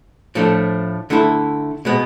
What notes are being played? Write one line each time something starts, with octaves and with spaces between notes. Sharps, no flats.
A2 F3 A3 D4
D3 A3 E4 A4
B2 G#3 B3